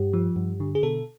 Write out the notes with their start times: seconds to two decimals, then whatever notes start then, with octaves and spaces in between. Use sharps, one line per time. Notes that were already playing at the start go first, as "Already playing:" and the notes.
Already playing: G2 G4
0.13 F3
0.36 G2
0.60 D3
0.75 G#4
0.83 B2 A4